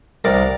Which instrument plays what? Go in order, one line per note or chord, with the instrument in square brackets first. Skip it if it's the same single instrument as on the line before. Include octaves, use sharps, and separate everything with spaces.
[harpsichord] C2 A#4 D5